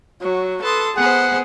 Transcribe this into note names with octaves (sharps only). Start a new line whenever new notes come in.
F#3 F#4
A4 B4 A5 C6 D#6
B3 G#4 C5 F#5